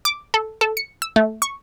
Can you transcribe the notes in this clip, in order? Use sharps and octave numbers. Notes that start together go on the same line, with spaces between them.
D6
A4
A4
C#7
E6
A3
C#6